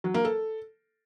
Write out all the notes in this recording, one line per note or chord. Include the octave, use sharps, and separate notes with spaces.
F#3
A#3
A4